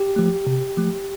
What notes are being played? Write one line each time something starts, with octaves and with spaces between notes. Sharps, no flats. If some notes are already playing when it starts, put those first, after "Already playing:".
Already playing: G4
F3 A3
C3
F3 A3